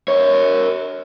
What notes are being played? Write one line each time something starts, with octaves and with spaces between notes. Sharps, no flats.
A#4 C#5